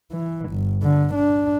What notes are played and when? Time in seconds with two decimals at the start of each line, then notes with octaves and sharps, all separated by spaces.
0.12 E3
0.50 G1
0.82 D3
1.15 D4